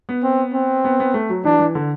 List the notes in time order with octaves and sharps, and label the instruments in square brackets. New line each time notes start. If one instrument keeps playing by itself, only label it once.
[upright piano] B3
[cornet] C4
C4
[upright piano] B3
B3
A3
F#3
[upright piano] E3 [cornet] D4
[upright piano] E3
D3